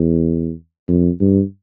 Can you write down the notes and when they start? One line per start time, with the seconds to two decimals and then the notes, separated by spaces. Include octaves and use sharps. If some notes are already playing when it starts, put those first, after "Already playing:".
Already playing: E2
0.88 F2
1.20 G2